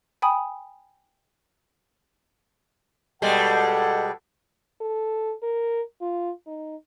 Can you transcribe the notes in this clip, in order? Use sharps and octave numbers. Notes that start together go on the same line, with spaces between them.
G5 G#5 B5 D#6
B2 G3 G#3 A4 F#5
A4
A#4
F4
D#4